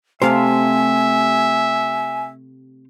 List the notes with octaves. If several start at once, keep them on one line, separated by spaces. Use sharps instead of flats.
C3 A3 G4 C5 E5 F5 G#5 A5